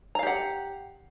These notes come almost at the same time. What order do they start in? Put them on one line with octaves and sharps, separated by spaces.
A#5 F5 G4 F#5